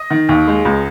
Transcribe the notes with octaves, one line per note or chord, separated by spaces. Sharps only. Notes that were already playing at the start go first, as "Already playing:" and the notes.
Already playing: D#5
D#3
D#2
G#3
C#2